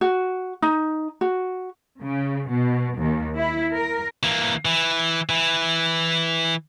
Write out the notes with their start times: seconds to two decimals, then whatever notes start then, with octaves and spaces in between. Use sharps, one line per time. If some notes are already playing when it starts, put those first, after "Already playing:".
0.01 F#4
0.62 D#4
1.21 F#4
2.02 C#3
2.49 B2
3.00 D#2
3.37 E4
3.74 A#4
4.23 E3 A#3
4.65 E3
5.29 E3